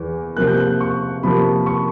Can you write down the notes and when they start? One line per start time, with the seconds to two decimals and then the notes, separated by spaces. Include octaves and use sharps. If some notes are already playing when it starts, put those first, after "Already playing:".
Already playing: E2 E3
0.36 C3 F3 A#3 F#6
0.47 G6
0.57 F#6
0.81 C#6
1.23 C3 F3 A#3 B5
1.66 C#6